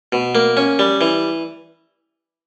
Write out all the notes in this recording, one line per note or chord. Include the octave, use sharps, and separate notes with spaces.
B2
A#3
C#4
G3
E3